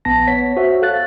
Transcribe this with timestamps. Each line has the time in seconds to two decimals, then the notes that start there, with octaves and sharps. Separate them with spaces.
0.05 A#1 B3 A5 A#6
0.27 B3 C#5 B6
0.57 F#4 C5 C#5 E5
0.82 A4 F5 F#6 A6